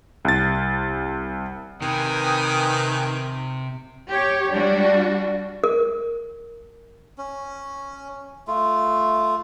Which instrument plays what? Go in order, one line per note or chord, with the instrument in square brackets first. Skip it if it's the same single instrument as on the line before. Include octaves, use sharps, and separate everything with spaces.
[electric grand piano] C2 A6
[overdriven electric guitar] C3 [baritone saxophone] D#3 [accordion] B4 G5 G#5 [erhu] D#6
[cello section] G4 C#5
G3 D4 F#4
[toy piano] A#4
[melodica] C#4
A3 F4